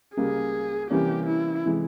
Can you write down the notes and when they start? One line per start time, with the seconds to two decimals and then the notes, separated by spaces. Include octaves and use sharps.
0.17 C#2 C#3 G3 A#3 G#4
0.90 C3 E3 G3 A#3 C#4 G4
1.27 E4
1.64 C3 E3 G#3